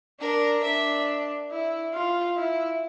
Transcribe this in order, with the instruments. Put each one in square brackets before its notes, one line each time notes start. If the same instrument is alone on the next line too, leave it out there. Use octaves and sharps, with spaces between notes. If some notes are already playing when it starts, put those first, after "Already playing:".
[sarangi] D4 [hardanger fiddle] A#4
[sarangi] D4 [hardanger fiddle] E5
[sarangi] E4
F4
E4